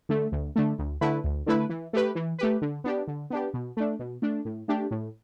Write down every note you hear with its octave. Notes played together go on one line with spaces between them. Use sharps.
D3 A3
D2
D3 A3
D2
D3 A3 E4 B4
D2
D3 A3 E4 B4
E3
A3 G4 B4
E3
A3 G4 B4
D3
B3 D4 G4
D3
B3 D4 G4
B2
A3 D4
B2
A3 D4
A2
A3 D4 G4
A2